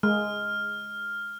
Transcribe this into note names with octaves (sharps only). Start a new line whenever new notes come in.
G#3 F6